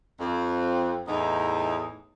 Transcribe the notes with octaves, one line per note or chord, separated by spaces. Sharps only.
F2
E2 A2 D#4